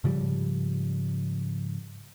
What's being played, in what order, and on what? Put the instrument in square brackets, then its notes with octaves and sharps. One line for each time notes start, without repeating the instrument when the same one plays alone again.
[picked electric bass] G#2 C#3 F3 G3